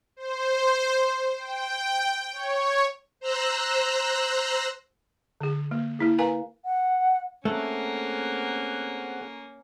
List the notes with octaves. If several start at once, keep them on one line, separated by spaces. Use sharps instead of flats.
C5
G5
C#5
C5 A#5 E6 F#6
D3 G#4
A#3
A#3 E4 G#4
A#4 B4 F5 G#5 A#5
F#5
A3 A#3 C4 C#4 G#4 F#5